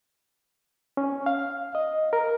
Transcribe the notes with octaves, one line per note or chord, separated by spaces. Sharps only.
C#4
F5
D#5
A#4